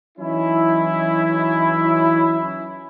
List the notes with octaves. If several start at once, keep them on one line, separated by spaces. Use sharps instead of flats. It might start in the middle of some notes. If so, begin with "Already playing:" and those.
E3 F#3 C#4 D#4 E4